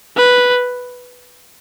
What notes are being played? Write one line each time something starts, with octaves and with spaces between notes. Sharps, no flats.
B4